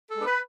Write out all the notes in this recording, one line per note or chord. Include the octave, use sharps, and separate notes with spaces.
A4
G#3 B3 D4
B4